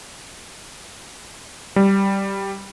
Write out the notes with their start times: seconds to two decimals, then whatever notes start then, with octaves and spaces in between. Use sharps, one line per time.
1.76 G3